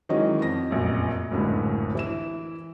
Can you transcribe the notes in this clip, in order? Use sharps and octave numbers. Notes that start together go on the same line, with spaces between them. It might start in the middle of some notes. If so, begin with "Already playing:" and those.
D#3 E3 F#3 G#3 C#4 D#5
F2 A#6
F1 A#1 F#2
F#1 C#2 F#2 A2 D3
E3 E4 E7